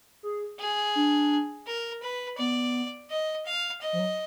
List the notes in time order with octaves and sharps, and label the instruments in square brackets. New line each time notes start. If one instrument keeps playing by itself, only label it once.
[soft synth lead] G#4
[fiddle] G#4
[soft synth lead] D4
[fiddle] A#4
B4
[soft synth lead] B3 [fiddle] D5
[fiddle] D#5
F5
D#5
[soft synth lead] F3
F#3